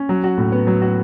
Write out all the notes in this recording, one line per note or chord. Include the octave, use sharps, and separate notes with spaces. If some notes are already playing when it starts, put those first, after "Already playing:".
Already playing: C#4
F#3
F#4
A2
B3
F#3
F#4